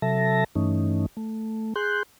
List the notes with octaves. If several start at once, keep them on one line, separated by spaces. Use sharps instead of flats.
C3 F#3 A4 E5 A5 A#6
G2 E3 A3 C#4 D#4
A3
G#4 C6 F#6 G6